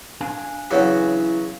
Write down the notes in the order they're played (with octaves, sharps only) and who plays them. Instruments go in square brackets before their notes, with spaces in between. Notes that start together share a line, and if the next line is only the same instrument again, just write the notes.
[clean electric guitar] D4 F5 G#5
[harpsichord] C#3 F#3 B3 [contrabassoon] E3 [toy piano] G#4 C#5 F#5